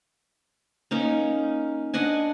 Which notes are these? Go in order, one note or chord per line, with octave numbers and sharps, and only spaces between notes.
A#3 C#4 D#4
D4 D#5 F#5 G#5